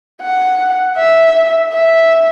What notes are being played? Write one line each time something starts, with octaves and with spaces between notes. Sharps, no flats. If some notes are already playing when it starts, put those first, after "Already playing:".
F#5
E5
E5